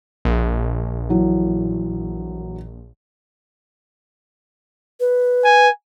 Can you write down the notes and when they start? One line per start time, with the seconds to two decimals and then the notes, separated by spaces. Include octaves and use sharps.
0.25 A#1
1.10 E3 F#3
5.00 B4
5.45 G#5